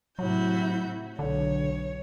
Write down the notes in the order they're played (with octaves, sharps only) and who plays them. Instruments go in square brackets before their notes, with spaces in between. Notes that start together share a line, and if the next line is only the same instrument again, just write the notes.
[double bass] A2 C3 [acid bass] F#3 [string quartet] E4 F#4 G6
[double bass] B1 [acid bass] D3 [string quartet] C#5